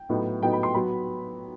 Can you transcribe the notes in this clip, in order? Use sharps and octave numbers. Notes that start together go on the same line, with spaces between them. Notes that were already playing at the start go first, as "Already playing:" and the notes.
Already playing: G5
A2 F#3 B3 D#4
A2 F#3 B3 D#4 G5
B5
C6
F#3 B3 B5